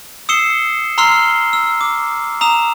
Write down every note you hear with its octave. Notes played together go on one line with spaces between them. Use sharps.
D#6 E6 C7 C#7 E7 G7
A#5 C6 E6 F6 C7 G7
E6
D6
A#5 D#6 E7